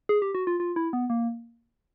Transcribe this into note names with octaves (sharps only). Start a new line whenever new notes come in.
G#4
G4
F#4
F4
F4
E4
B3
A#3